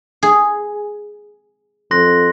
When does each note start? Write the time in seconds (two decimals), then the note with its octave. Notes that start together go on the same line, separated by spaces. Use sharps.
0.23 G#4
1.91 F2 C6 F#6 A#6